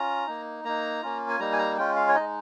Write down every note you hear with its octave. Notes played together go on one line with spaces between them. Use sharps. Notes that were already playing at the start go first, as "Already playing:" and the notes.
Already playing: C#4 F4 A#5
A#3 D#4
A#3 D#4 A#5
A#3 C#4 F4
G#5
G3 A#3 D#4 A#5
G#5
A#5
G#3 C#4 F4 G5
F5
C#5
G#3 D#4 D#5